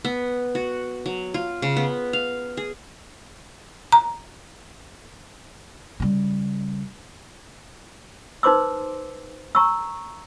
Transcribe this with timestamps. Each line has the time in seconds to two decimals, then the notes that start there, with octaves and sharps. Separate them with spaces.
0.05 B3
0.55 F#4
1.06 F#3
1.34 F4
1.62 C#3
1.77 B3
2.13 F5
2.57 G#4
3.92 A#5
6.00 C#3 G3
8.43 D#4 B4 C5 C6 D6 E6
9.55 A#5 C#6 E6